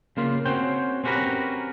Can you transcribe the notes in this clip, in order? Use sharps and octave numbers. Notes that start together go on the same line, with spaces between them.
C#3 A#3 F4
C4 C#4 F#4 C5 G5
C4 C#4 F#4 G4 A#4 B4